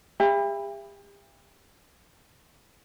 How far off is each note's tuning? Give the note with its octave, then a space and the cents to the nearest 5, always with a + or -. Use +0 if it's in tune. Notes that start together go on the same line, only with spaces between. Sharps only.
G4 +40 E5 +30 B5 +0